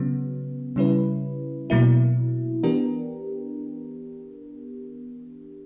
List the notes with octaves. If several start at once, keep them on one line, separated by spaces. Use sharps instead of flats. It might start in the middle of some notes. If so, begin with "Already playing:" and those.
Already playing: C#3 F#3 B3
C#3 G3 C#4 E4 B4
B2 F#3 A#3 E4
E3 B3 D4 G4 A#4